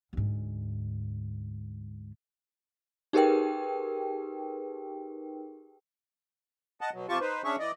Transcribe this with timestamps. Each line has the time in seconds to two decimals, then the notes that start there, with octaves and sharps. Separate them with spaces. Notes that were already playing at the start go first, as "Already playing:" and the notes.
0.13 D2 G#2
3.13 D#4 G4 G#4 A#4 B4 G5
6.81 D#5 F#5 A5
6.94 B2 F#3
7.09 F2 C3 F4 G4 A5 C#6
7.21 D#4 B4 C5
7.44 C#4 D4 G#4 C#5 E5 C#6
7.59 E3 D5 D#5